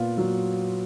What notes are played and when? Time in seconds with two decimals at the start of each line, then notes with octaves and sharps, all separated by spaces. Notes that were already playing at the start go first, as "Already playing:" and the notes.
Already playing: A#2 B3 F4
0.18 F#3